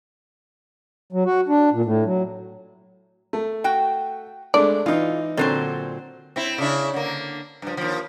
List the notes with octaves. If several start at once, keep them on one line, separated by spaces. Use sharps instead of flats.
F#3
F#4
D4
A#2
A2
F#3
A3
F#4 G5
G#3 A3 D4 D5
E3 D#4 F4
A#2 D3 F#3 C4 C5
C4 E4
C#3 D4 E4
D3 A#3
G2 F3
D#2 F3